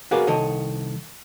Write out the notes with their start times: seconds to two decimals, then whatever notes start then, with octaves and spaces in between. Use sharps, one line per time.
0.11 F#4 G#4 A#4 B4 D5 F5
0.27 C2 D#3 A4 C#5 D#5